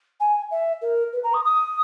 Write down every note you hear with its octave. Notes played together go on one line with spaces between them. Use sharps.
G#5
E5
A#4
B4
A#5
D#6
D#6